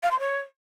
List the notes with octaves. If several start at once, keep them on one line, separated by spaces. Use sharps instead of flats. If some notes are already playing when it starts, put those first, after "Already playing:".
F5
C6
C#5